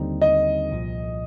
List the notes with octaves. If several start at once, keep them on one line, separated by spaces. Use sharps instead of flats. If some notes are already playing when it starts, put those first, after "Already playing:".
Already playing: D#2 D3 G3 C4 D#4
D#5
C2 A#2 F3